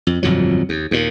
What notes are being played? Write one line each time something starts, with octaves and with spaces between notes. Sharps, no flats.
F2
G1 F2 A#2 F#3
D#2
D#2 A#2